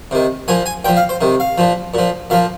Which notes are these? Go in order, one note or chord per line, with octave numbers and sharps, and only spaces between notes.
C3 D#3
A#2 F3 G#5
G#5
A#2 F3 G5
F5
C5
C3 D#3
F5
A#2 F3
A#2 F3
A#2 F3 F5